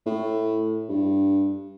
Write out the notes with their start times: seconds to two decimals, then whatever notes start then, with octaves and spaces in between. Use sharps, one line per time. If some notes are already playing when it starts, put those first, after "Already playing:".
0.06 A2
0.89 G2